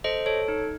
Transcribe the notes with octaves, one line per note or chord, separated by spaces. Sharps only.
A4 C5 D#5
A4 C#5
D#4